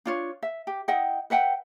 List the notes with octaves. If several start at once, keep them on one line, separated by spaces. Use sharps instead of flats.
D4 F4 C#5
E5
G4
E4 D#5 F#5 G5
B4 E5 F#5 G5